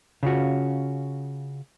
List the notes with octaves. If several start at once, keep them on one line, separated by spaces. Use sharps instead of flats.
C#3 C#4 F4 F#4